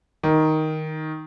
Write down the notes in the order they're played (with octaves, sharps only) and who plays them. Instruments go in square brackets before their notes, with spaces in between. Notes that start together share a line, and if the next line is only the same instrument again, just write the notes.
[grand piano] D#3